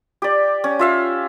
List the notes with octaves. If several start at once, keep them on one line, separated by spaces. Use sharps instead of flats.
G4 D5
C#4
F4 E5 F5